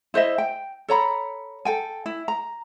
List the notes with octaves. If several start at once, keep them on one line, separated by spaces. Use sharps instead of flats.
E4 C5 D#5 E5
G5
A4 C#5 A#5 B5
A4 G5 G#5
E4
A#5